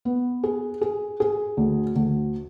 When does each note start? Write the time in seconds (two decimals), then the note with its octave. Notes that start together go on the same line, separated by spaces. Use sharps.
0.05 B3
0.43 G#4
0.81 G#4
1.20 G#4
1.57 D2
1.96 D2